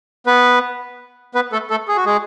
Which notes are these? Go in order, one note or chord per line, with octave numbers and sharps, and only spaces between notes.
B3 B4
B3 B4
A3 A4
A3 A4
G#4
F#4
G#3 G#4